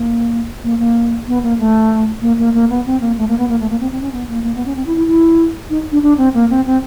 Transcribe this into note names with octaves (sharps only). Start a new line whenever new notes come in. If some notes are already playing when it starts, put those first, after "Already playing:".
Already playing: A#3
A#3
A#3
B3
A#3
A3
A#3
A#3
A#3
B3
C4
A#3
A3
A#3
B3
A#3
A3
A#3
C4
C4
C#4
B3
A#3
A#3
B3
C#4
C4
E4
E4
E4
D#4
D4
D4
C4
A#3
C4
C4